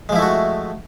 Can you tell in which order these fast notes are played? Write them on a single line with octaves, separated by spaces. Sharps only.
G#3 F3 E4 A3 F#4